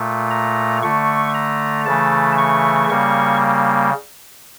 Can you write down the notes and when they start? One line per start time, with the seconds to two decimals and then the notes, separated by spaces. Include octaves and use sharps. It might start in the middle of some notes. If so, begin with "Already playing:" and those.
Already playing: A#2 A3
0.30 A#5
0.83 D3 A3 C#6
1.34 A#5
1.86 C#3 E3 A3 A5
2.38 C#6
2.90 C#3 G3 A#3 C#6